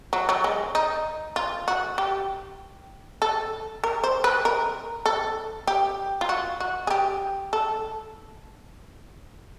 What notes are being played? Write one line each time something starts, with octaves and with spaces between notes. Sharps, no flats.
F#3
F#3
G#3
D#4
F4
F#4
G4
A4
A#4
C5
B4
A#4
A4
G4
F4
F#4
F#4
G#4
G4
A4